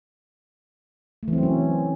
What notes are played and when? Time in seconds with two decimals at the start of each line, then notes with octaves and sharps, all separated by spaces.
1.23 A3
1.28 E3
1.33 C4
1.38 F#3
1.43 C#4